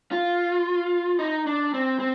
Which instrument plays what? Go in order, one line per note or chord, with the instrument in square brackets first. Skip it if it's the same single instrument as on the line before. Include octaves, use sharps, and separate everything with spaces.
[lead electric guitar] F4
D#4
D4
C4
C4